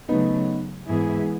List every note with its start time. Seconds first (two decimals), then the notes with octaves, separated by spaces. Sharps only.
0.08 C#3 F#3 A3 B3 D#4
0.87 G#2 E3 B3 E4 G#4